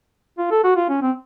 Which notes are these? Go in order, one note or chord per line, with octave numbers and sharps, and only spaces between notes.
F4
A4
F#4
F4
C#4
C4